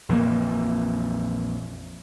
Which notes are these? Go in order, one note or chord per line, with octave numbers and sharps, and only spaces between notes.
A#1 F2 E3 A#3